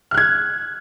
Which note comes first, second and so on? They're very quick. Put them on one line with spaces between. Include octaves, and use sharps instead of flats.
F6 F#6 G#6